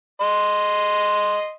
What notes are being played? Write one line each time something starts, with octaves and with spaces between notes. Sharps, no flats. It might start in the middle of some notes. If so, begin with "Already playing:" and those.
D#5 C6